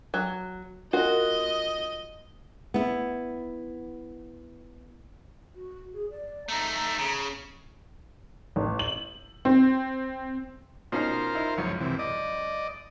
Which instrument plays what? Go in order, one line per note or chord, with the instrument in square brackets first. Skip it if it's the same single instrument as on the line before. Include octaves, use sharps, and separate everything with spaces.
[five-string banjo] F#3
[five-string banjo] F4 F#4 A#4 [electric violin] D#5
[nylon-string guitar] B3 E4
[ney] F#4
G#4
D5
[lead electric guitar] A3 D#4 [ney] A#5
[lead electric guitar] C#3
[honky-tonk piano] A1
F#7
C4
[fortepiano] B2 C#4 D#4 [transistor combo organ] F4 A#4 C5
[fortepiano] D#4 E4
[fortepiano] C#2 F#2 [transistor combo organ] F3 C#5
[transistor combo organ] C3 E3
D5 D#5